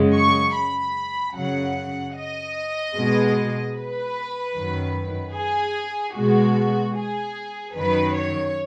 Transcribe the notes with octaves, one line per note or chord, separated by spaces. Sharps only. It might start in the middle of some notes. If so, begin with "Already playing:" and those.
Already playing: F#2 C#3 G#3
C#6
B5
F#2 C#3 F#3 F#5
D#5
B2 G#3
B4
F#2 D#3 F#3
G#4
B2 G#3 F#4
G#4
F#2 D#3 F#3 B4
C#5